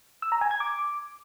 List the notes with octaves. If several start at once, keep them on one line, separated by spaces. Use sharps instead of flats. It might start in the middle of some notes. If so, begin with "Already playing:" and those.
E6
A#5
G#5
G#6
D6